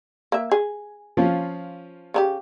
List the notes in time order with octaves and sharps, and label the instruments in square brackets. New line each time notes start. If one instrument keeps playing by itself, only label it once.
[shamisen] A#3 E5
G#4
[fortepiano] F3 C#4 F4
[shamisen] C#3 D#4 G4